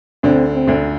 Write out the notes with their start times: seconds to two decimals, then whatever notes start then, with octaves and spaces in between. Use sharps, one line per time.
0.23 D2 D3 C4
0.53 C4
0.67 D2 D3